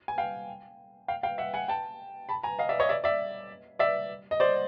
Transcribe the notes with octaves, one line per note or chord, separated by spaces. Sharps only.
G#5
F5 G5
F5 G5
F5 G5
E5 F#5
F#5 G#5
G5 A5
A5 B5
G#5 A#5
D#5 F5
D5 E5
C#5 D#5
D5 E5
D5 E5
D5 E5
D#5
C5 D5